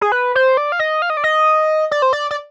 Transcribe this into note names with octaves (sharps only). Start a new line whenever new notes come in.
G#4
B4
C5
D5
F5
D#5
F5
D#5
D5
D#5
D5
C5
D5
D5